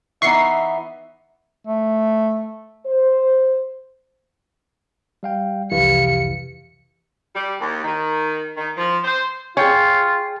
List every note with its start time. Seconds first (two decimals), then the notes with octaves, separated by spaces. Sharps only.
0.22 E3 B3 D#4 E5 C#6 C7
1.67 A3
2.86 C5
5.23 G3 F5 G5
5.72 C2 F2 E3 G4 B4 F5 C#7
7.35 G3
7.60 D#2
7.84 D#3
8.56 D#3
8.77 F3
9.04 C5
9.57 F4 G#4 C#5 G5 G#5